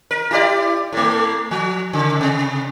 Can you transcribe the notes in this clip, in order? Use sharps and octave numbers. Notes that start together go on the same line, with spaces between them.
A#4
E4 G4 D5
A2 A3
F3
C#3
C3